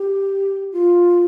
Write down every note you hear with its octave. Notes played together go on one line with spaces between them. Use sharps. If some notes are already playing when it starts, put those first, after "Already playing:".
Already playing: G4
F4